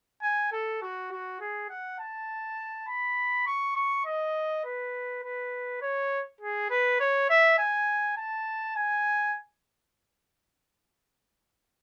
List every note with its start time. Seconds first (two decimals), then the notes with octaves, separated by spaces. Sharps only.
0.22 G#5
0.52 A4
0.82 F#4
1.11 F#4
1.41 G#4
1.70 F#5
1.99 A5
2.88 B5
3.47 C#6
3.76 C#6
4.05 D#5
4.64 B4
5.23 B4
5.82 C#5
6.41 G#4
6.70 B4
7.00 C#5
7.29 E5
7.58 G#5
8.17 A5
8.76 G#5